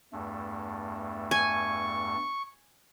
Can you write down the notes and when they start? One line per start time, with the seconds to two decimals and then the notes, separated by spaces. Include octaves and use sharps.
0.13 E2 G2 A3
1.31 G#5 C#6